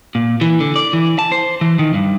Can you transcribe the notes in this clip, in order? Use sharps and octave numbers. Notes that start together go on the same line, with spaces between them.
A#2
E3
D3
D5
E3
A5
C5
E3
D#3
G2